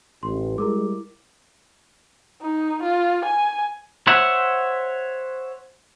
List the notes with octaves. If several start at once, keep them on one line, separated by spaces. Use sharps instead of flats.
A1 C6
G3 G#3 E4 A#4 D6
D#4
F4
G#5
C5 C#5 E5 F#5